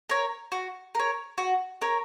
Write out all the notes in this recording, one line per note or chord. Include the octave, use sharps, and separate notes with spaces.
A#4 C#5
F#4
A#4 C#5
F#4
A#4 C#5